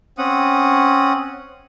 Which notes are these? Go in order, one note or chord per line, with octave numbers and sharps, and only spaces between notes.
C4 C#4 F#5 D#6